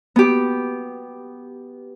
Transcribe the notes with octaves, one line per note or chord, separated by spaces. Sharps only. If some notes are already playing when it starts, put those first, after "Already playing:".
B3 G4